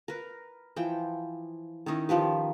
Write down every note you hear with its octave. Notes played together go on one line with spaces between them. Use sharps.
A#4 B4
E3 F3 G5
D#3 C#4 D#4 E4
D#3 F3 G4 B4